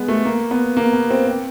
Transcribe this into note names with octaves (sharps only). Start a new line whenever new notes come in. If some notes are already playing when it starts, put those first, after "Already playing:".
Already playing: G#3 B3
A3
A#3
B3
A#3
B3
C4
C4